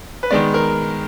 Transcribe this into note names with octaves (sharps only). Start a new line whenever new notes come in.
B4
D#3 G#3 B3 D5
A#4